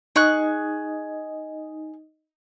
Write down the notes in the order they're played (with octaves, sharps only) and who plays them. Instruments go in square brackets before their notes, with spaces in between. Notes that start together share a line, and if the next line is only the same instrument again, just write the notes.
[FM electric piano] D#4 D#5 [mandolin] G#4 C#6 F#6